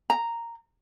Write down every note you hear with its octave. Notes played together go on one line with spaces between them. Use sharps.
A#5